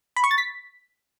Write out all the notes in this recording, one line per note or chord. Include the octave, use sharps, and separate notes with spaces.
B5
C#6
A6
B6